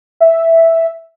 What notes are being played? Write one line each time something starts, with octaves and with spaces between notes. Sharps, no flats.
E5